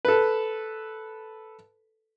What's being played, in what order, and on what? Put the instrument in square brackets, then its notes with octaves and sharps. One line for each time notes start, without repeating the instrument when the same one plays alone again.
[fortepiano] A4 B4